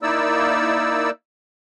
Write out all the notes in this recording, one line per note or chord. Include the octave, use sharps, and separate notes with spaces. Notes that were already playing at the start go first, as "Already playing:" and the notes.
A#3 D#4 E4 D5 E6